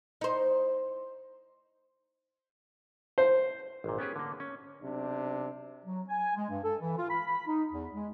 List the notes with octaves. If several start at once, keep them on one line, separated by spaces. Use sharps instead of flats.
D#4 C5
C5
G#1 A#2
B3 C#4 G4 G#4
D3 A#3
C#4
B1 C3 D4
F#3
G#5
G#3
G2
A4
E3
F4
B5
B5
D#4
E2
G#3